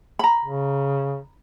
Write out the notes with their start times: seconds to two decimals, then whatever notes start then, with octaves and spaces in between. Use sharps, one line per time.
0.19 A#5 B5
0.45 C#3